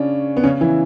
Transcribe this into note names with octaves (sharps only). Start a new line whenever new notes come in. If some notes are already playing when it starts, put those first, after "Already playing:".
Already playing: C#3 C#4 D4
B3
C#3 C#4
E3 E4